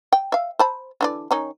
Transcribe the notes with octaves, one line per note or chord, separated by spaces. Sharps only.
G5
E5 F5
C5 A5 B5
D3 E3 D5
D#3 C#4 D#4